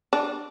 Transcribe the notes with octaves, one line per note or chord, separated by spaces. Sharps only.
D4